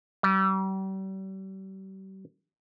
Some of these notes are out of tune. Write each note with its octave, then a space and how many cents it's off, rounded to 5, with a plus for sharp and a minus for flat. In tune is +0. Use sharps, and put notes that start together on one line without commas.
G3 -40